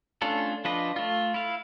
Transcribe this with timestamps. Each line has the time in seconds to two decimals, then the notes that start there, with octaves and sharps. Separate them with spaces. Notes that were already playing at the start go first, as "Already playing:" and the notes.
0.22 A3 C#4 D4 F4 A4
0.65 F3 D4 F4 B4 D#5
0.96 A3 F4
1.34 E4 F5